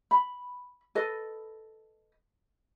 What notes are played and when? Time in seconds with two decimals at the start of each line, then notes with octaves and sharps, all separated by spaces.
0.11 B5
0.95 A4 B4 D#5